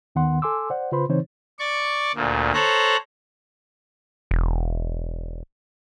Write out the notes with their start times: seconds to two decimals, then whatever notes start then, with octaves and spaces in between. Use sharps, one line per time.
0.15 D#2 D#3 B3 F#5 C6
0.42 A4 G#5 C6 D6 E6
0.70 C5 D5 F#5
0.92 C#3 F4 B4 C5 B5 C6
1.09 C#3 E3 C4 D#4 C5 C#5
1.59 D5 C#6 D6
2.15 D2 A#2
2.54 A4 C5 C#5 A#5 F#6
4.31 E1